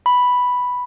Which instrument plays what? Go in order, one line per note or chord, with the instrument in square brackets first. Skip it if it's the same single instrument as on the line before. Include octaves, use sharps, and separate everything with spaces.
[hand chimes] B5